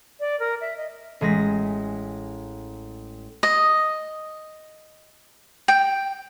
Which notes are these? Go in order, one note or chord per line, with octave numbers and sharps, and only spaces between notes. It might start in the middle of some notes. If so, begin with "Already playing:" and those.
D5
A#4
E5
D#5
A1 G#3 A#6 B6
D#5
G5